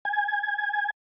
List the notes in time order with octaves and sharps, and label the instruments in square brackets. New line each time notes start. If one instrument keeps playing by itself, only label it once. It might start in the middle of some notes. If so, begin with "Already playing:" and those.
[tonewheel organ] G#5